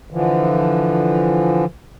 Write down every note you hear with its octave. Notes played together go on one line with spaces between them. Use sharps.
D3 E3 F3